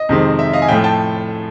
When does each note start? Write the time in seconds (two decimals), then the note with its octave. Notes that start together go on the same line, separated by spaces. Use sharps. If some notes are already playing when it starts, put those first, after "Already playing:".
Already playing: D#5
0.09 F2 C3 D#3 G#3 C4
0.39 E5
0.53 D#5 F5
0.62 G#5
0.68 A2 F3 A3 F5 G5
0.84 G5 A5